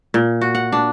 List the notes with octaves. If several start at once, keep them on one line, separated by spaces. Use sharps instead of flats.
A#2
F#4
F#5
D4